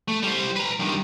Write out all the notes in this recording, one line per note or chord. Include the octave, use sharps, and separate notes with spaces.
A3
G3 C5
B4 A#5
G2 D#3